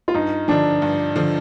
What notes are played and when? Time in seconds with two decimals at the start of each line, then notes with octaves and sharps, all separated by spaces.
0.08 F4
0.14 G2 D#4
0.48 D3 F3 D4
0.82 G2
1.16 D3 F3